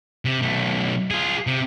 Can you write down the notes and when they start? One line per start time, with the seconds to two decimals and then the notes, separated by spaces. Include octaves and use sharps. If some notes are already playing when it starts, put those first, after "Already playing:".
0.25 C3
0.42 B1 A3
1.11 F4 G#4
1.47 C3